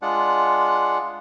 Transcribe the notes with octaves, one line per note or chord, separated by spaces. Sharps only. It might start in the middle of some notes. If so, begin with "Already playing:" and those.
G#3 D4 F4 F#5